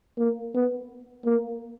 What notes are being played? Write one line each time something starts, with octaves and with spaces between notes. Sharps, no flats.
A#3
B3
A#3